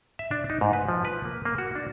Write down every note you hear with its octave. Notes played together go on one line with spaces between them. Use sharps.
E5
D4
D#4
G#2
B4
F3
B4
A#3
A#3
F#4
D4